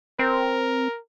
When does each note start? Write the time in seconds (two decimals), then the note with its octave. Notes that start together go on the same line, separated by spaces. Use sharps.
0.19 C4 A#4